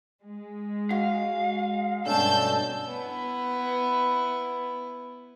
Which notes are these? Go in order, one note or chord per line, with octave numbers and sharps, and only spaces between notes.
G#3
F#4 F5
G2 B2 D3 A3 C#4 A5 E6 G6
B3 E4